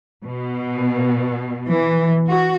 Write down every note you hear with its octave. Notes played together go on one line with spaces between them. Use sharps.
B2
E3
F#4